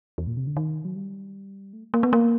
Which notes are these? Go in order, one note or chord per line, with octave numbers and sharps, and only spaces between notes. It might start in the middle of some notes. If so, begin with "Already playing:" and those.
E2
A#2
C3
D3
D#3
F#3
G3
A3
A#3
B3
A#3